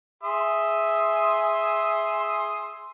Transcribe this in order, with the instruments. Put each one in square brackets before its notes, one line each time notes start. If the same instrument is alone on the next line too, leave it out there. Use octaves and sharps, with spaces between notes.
[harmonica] G#4 C6 D#6 [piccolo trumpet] E5